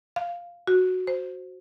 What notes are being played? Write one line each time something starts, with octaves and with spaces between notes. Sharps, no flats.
F5
F#4
C5